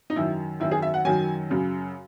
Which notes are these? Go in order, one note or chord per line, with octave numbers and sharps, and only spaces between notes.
D#4
F#2 D#3 F#3 E4
F#2 D#3 F#3 E4
G#4
E5
F#5
F#2 D#3 F#3 G#5
F#2 C#3 F#3